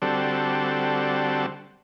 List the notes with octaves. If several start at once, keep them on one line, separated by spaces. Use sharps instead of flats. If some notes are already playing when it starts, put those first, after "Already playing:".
D3 G3 C4 F#4 A4